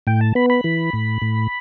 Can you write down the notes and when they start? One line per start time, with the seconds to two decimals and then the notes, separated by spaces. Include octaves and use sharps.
0.07 A2 G5
0.21 A5
0.35 B3 B5
0.50 B5
0.64 E3
0.93 A2
1.22 A2